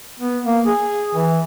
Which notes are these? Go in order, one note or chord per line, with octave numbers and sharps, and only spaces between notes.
B3
A#3
G#4
E3